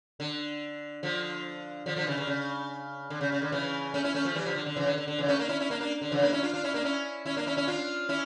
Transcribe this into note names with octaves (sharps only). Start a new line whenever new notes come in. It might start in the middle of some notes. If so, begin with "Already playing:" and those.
D3
D3 F3
D3 F3
D3 F3
C#3 E3
D3
C#3
D3
C#3
C#3
D3
C#3 E3
A3 C#4
C#4 E4
A3 C#4
F3 A3
E3 G3
D3 F3
D3
D3
C#3 E3
D3
D3
D3
C#3 E3
A3 C#4
A#3 D4
C#4 E4
C#4 E4
A#3 D4
A#3 D4
D3
C#3 E3
A#3 D4
C#4 E4
D4 F4
D4 F4
C#4 E4
A#3 D4
C#4 E4
C#4 E4
A#3 D4
C#4 E4
C#4 E4
D4 F4
C#4 E4